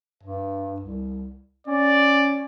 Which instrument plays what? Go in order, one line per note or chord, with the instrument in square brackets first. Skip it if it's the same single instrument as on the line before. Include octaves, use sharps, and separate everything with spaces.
[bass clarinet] G2
C2
[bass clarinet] C#4 [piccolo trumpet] D5